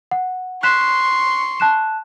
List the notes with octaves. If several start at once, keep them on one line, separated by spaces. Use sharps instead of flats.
F#5
C6 C#6 F#6 B6 E7
A5 F#6 E7